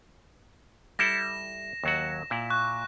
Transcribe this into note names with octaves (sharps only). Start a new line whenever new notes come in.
G3 E4 A4 A#6 E7
D#2 F#3 F#4
A#2 E4
C#6 F#6